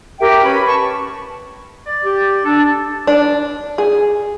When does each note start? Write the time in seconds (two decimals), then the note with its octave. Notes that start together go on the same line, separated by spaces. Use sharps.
0.20 G4 A#4 E5 G5
0.44 C#4 B4 B5
0.67 A5 C#6
1.87 D5
2.04 G4
2.45 D4 A4
3.07 D4
3.78 G#4